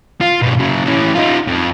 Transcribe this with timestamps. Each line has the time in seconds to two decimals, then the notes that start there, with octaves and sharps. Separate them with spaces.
0.21 F4
0.42 G2 B2
0.59 C#3 F#3
0.86 E3 C#4
1.15 D#4 F4
1.48 F2